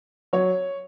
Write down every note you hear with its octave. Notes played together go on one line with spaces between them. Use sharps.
F#3 C#5